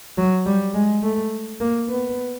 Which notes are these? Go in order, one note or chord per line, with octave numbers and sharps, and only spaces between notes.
F#3
G3
G#3
A3
A#3
B3